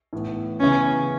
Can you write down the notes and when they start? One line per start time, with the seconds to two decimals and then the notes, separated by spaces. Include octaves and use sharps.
0.13 A2 E3 B3
0.61 C#3 E3 B3 C#4